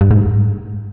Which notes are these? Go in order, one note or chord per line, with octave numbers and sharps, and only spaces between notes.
G2
G#2